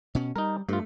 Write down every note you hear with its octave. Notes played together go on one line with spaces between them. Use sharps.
B2 C#4
G3 D#4 A#4
G2 A3 F4